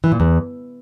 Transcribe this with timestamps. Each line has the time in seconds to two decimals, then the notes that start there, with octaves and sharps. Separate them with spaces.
0.04 E3
0.12 A#2
0.20 E2